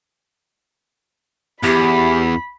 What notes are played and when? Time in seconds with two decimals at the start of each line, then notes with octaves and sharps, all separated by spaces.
1.63 E2 G4 B5